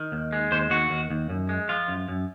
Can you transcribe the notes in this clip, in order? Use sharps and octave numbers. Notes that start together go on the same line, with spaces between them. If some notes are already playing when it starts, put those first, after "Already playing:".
Already playing: D#3
D#2
G#3
D#2 C5
D#2 F#4
D#2
D#2
F#2
G#3
F3 F4
F#2
F#2